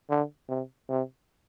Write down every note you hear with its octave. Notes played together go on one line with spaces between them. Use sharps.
D3
C3
C3